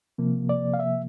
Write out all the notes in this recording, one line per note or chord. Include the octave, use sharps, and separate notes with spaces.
C3 F3 A#3
D5
F5
E5